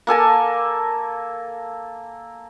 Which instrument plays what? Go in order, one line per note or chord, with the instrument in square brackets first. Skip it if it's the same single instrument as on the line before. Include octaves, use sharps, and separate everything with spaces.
[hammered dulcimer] A#3 A4 G#5 A5